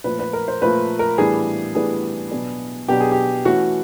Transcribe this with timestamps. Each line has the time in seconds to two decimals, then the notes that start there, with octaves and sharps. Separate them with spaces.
0.04 A#2 F3 A3 B4
0.19 B4
0.33 A#4
0.48 C5
0.62 A#2 F3 A3 B4
0.99 A#4
1.18 A2 E3 G3 B3 D4 G#4
1.75 A2 E3 G3 B3 D4 G#4
2.31 B2 F#3 B3 D4
2.88 B2 F#3 B3 D4 G4
3.00 G#4
3.11 G4
3.45 E3 A3 C#4 F#4